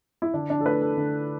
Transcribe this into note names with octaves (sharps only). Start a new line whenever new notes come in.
E4
D3 D4
D4
A4
A3 B4
A4
D3